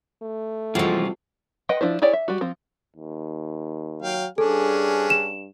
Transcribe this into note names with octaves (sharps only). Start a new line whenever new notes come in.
A3
E3 F3 G3 G#3 C4 F4 F#4 G#4
B4 D#5 F#5 G5
F3 D4 E4 C5
E4 G#4 C#5 D5 G5
E5
G3 F#4
F3 C4
D#2
F#3 F5 G5
G2 C#4 D4 G#4 A4
E7